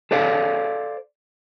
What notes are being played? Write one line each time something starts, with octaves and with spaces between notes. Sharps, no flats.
A4 C5 D5 E5 F5